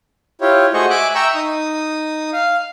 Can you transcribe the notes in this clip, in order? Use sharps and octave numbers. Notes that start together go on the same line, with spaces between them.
E4 F4 G4 C#5
A3 F#4 G#4 C5 D#5 C#6
E5 G#5 D6 F#6
E5 G5 A#5 C#6 E6
D#4 D#6
F5